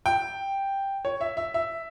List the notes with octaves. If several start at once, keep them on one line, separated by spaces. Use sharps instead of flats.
G5
C#5
E5
E5
E5